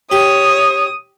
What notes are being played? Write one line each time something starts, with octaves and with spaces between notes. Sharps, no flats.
G4 C#5 D#6